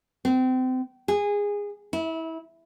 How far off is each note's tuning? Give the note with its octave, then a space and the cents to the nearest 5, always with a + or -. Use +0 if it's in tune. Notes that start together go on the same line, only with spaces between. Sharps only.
C4 -30
G#4 -20
E4 -25